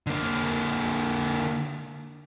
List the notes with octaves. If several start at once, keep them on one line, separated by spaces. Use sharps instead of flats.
D3 A#3